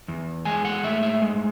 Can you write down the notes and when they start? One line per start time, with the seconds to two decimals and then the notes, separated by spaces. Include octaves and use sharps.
0.08 E2
0.45 G#3 G#5
0.65 F#5
0.83 A2 E5
1.03 E5
1.22 G#3